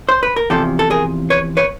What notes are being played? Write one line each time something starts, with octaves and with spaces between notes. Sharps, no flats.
C5
B4
A#4
E2 C3 F3 G4 A4
A4
G#4 A#4
B4 C#5
B4 C#5